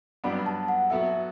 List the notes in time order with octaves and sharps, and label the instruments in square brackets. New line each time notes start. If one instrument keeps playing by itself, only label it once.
[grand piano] G2 F#3 B3 D4 G4 [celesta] B5
[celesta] A5
F#5
[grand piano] F#3 B3 F#4 A4 [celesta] E5